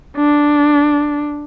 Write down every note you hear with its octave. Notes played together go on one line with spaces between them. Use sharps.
D4